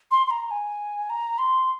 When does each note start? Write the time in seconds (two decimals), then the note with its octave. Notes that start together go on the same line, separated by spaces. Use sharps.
0.11 C6
0.27 C6
0.31 A#5
0.51 G#5
1.10 A#5
1.38 C6